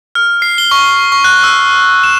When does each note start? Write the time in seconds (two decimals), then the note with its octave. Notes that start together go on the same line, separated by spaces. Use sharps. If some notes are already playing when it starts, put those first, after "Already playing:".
0.15 F6
0.42 C7
0.58 G7
0.71 C#6
1.12 C#6
1.24 F#6
1.44 E6
2.04 E7